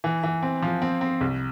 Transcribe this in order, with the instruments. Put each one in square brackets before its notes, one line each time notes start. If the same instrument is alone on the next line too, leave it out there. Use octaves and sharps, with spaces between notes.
[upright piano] E3
E3
C4
F3
C4
C4
C2